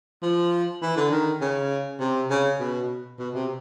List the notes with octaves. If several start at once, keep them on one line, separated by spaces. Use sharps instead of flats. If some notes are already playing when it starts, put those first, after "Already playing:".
F3
E3
D3
D#3
C#3
C3
C#3
B2
B2
C3